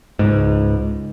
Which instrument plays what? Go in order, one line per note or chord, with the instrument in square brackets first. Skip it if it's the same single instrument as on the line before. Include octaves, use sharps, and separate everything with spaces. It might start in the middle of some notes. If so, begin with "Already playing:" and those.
[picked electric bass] C#2 G#2